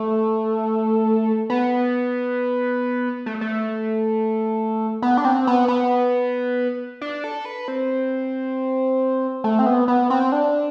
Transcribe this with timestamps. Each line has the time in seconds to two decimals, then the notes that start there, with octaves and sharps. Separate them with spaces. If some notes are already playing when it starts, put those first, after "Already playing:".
Already playing: A3
1.50 B3
3.26 A3
3.41 A3
5.02 B3
5.17 D4
5.25 C4
5.47 B3
5.68 B3
7.01 D4
7.24 A4
7.45 B4
7.68 C4
9.44 A3
9.59 C4
9.66 B3
9.88 B3
10.10 C4
10.32 D4